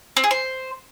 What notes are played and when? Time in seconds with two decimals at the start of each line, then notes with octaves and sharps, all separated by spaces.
0.17 C4
0.24 G#4
0.31 C5